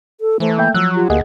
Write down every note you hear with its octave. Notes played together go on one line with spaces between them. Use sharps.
A4
E3 A3 C5
A#3 E5 G5 G6
F3 F#3 E6 F#6
F4 G4
D2 A#3 G#4 D#5 F#5